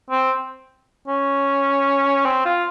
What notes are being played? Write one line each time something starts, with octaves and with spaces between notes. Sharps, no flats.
C4
C#4
C4
F4